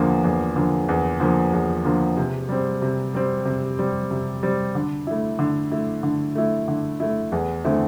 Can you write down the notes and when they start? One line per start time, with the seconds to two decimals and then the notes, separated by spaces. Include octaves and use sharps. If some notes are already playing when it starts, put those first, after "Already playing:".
Already playing: E2 D3 F3 A#3
0.24 E2
0.56 D3 F3 A#3
0.89 E2
1.20 D3 F3 A#3
1.53 E2
1.85 D3 F3 A#3
2.17 C3
2.49 G3 C4
2.82 C3
3.14 G3 C4
3.45 C3
3.79 G3 C4
4.11 C3
4.43 G3 C4
4.75 D3
5.07 A3 E4
5.39 D3
5.71 A3 E4
6.03 D3
6.35 A3 E4
6.68 D3
7.00 A3 E4
7.32 E2
7.64 D3 A3 C4 E4